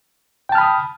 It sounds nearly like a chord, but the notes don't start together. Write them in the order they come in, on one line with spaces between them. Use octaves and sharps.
G5 A5 F6 B5 D#6